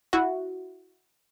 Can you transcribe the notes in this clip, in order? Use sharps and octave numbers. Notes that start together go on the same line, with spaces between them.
E4 F#4